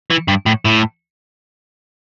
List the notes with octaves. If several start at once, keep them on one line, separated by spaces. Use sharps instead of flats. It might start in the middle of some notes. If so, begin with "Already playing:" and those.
E3
G2
A2
A2